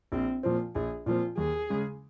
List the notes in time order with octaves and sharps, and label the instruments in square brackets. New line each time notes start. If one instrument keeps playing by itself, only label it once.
[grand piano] A#1 [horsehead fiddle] C4
[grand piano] A#2 F3 C4 [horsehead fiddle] F4
[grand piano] A#1 [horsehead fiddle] G#4
[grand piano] A#2 F3 C4 [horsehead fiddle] F4
[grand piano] D#2 [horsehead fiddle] G#4
[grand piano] C#3 G#3 C#4